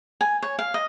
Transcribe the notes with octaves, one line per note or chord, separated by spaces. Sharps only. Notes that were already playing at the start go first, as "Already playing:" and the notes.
G#5
C#5
F5
D#5